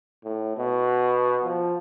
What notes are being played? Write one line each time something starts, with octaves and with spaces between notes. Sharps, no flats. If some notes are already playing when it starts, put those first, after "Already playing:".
A2
B2
F3